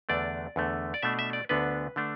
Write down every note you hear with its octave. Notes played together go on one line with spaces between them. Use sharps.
E2 D3 A3 D4 D5
E2 D3 A3
D5
B2 A3 D4 E5
E5
D5
D2 D3 B3 D4 B4
D3 A3 D4